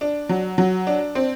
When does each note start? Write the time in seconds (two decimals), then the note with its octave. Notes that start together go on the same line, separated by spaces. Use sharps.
0.01 D4
0.29 F#3
0.58 F#3
0.87 D4
1.15 C4